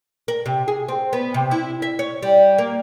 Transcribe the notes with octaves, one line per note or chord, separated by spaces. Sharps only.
A#4
C3
G#4
C4
B3
C3
E4
E5
C#5
G3
A#3